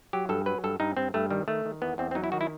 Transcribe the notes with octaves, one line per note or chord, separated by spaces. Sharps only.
F#3 G4
G2 A4
F#3 B4
G2 A4
G2 D#4
G2 C4
G2 A3
D#3 G3
D#3 A3
D#3
E2 B3
E2 C4
C4
F#3 D#4
E4
D#3 F#4
E4